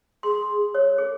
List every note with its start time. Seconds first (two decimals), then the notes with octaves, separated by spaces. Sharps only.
0.23 G#4 C6
0.75 C#5
0.98 G#4